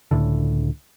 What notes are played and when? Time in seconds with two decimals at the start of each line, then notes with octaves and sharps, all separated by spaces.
0.11 C#2 A2 D3